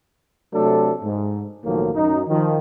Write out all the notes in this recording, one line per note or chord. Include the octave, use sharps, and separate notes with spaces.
C3 F#3 A3 D4 A4
G#2
B1 A2 D#3 F3 F#3 A#3
F#2 D#4
D#3 F3